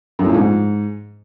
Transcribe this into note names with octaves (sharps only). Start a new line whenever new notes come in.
F#2
A2
A#2
G#2